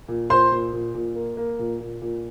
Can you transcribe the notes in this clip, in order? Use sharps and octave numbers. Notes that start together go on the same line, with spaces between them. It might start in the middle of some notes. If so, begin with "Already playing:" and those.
A#2
A#2 C5 C6
A#2
A#2
A#2
A#3
A#3
A#2
A#2
A#2